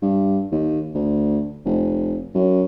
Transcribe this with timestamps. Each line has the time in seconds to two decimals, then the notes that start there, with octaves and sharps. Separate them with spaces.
0.02 G2
0.51 D#2
0.94 D2
1.65 F1
2.35 F#2